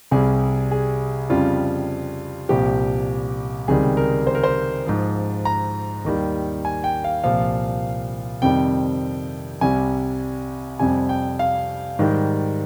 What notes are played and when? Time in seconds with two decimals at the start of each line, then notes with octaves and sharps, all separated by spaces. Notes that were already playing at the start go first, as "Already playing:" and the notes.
0.11 C2 C3 G3 G#4
0.71 G#4
1.30 F2 C#3 G3 F4
2.49 C2 A#2 F3 G4
3.68 C#2 C3 D#3 G3 G#4
3.97 A#4
4.27 C5
4.35 A#4
4.43 C5
4.87 G#2 F3
5.45 A#5
6.05 D#2 D#3 G3
6.65 G#5
6.84 G5
7.04 F5
7.24 C2 A#2 F3 F5
8.42 F2 C3 D#3 G3 G5
9.61 C2 C3 G3 G#5
10.79 F2 C3 G3 G#5
11.09 G5
11.39 F5
11.99 G#2 D#3 G3